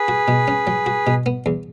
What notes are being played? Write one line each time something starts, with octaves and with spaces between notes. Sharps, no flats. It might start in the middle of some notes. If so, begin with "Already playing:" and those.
Already playing: G#4 B4
F#4
B2
C#4
F#3
F#4
B2
B3
E2